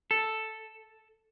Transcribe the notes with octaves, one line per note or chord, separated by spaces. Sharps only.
A4